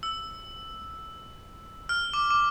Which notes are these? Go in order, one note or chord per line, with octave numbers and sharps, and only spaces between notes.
E6
F6
D6
D6